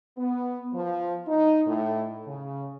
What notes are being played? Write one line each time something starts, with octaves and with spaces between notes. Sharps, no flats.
B3
F3
D#4
A2
C#3